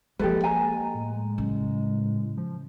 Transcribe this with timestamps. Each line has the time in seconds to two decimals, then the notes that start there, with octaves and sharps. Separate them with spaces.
0.19 F3 G#3 A#3 G4 A4 B4
0.44 G#5 A#5
0.94 A2
1.38 C#3 F#3
2.37 F3